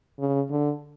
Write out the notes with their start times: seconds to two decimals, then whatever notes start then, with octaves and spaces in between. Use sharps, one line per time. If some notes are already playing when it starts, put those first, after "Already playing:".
0.20 C#3
0.51 D3